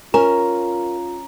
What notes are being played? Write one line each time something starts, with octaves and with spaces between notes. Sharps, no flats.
C#4 F4 A#4 A#5